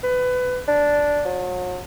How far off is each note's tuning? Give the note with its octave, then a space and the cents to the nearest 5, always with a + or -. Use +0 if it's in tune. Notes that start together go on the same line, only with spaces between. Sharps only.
B4 +20
D4 -5
F#3 -40